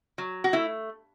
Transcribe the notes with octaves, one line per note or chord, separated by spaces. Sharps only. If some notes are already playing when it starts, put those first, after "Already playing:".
F#3
F#4
A3 E4